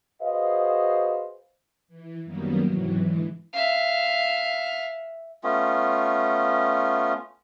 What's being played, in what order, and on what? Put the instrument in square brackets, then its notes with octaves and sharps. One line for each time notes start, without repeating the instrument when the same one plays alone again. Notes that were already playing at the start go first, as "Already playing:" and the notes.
[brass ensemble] F#4 G#4 B4 C5 D#5 F5
[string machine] E3
F#2 D#3 F#3 G3 A#3 B3
G#2 C3 E3 F#3
D3 E3 G#3
[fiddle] E5 F5
[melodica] A3 B3 C#4 F4